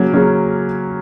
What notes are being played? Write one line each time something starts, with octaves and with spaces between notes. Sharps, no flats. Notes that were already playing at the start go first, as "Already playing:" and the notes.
Already playing: C#3 F#3 A#3 C#4
C#3 F#3 A#3 C#4